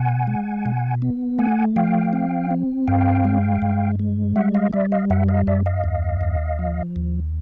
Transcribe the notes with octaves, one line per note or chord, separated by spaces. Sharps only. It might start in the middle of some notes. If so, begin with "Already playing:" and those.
Already playing: B2 F#5 G#5
G#3
B2
B3
A3 F#5 G#5
F3 F5 G5
C4
C4
G2 F5 G5
G#3
G2
G#3
G3 E5 F#5
D#5 F5
G3 D5 E5
D#5 F5
F#2 E5 F#5
D#5 F5
F#2 D5 E5
D#5 F5
D#2
D#2
F3
D#2